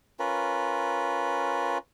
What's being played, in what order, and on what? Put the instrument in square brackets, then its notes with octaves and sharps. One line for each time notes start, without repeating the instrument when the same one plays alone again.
[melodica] C#4 F4 A#4 B4